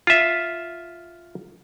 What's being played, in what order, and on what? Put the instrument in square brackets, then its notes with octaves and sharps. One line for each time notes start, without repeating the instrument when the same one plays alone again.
[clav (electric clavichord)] F4 E5